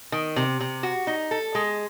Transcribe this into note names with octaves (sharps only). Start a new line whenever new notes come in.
D#3
C3
C3
F#4
D#4
A4
G#3